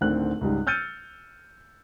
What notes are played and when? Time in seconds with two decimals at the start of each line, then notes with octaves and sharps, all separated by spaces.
0.01 D1 D2 D3 D#3 C4 F#6
0.41 C#2 G#2 G3
0.67 E6 F6 G6 A6 C#7 D#7